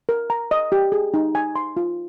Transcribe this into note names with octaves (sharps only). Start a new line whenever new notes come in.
A#4
A#5
D#5
G4
G#4
D#4
G#5
C6
F4